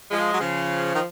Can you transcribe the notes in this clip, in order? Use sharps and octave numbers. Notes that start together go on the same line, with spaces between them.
F3 G#3
F#3
C#3 F3
D#3